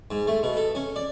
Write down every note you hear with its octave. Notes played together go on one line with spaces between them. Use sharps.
G#2
A3
B2
A4
C#4
D5